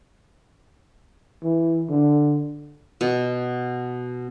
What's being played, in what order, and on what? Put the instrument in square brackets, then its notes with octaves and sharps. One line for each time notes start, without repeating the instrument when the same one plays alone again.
[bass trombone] E3
D3
[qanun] B2